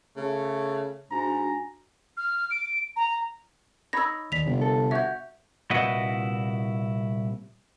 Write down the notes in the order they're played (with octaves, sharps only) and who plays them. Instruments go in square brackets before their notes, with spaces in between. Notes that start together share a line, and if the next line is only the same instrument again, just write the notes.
[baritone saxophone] C#3 [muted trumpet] A3
[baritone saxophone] G#2 [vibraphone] D4 F#4 G#5 [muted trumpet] A#5
[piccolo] F6
D7
A#5
[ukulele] D#4 C#5 B5 [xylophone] E6 A#6
[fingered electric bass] D#3 A#3 [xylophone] D5 B6 F7
[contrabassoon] G1 [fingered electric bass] C3
[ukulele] A4
[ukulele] F#4 C#5 [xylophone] E5 F#5 G6
[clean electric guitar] C2 A#2 E4 F#4 B4 D#5